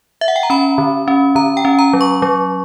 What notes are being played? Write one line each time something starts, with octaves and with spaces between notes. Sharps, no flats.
E5
F#5
G5
A#5
C#4 B5
D3
C#4
D3 A#5
G5
C#4
A#5
F#3
C#6
F#3